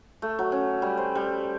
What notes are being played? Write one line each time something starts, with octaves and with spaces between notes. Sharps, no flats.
A3
F#3
C#4
G3
C5
G3